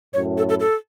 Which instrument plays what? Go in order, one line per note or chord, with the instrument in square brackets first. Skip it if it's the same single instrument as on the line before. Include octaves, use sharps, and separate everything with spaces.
[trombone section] F#2 A2 [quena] C#5
[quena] A4
A4
A4